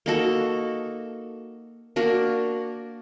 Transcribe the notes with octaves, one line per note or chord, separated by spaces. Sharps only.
A#3 D#4 F#4 A4
A#3 D4 F#4 A#4